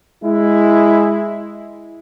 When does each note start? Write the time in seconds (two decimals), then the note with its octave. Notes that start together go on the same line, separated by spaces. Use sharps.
0.24 G#3 E4